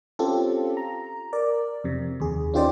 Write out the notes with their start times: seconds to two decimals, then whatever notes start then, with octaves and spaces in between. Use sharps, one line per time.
0.19 C4 C#4 F4 G4 A4
0.77 A#5
1.33 A#4 D5
1.84 F2 C3
2.20 D#2 G#4
2.54 C#4 D#4 F4 G4 C5 D5